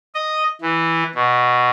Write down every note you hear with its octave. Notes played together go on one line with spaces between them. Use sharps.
D#5
E3
B2